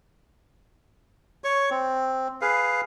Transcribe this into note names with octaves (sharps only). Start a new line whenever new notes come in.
C#5 C#6
C4
G#4 B4 F5